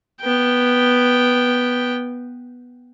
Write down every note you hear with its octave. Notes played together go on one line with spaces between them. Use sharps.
B3 G5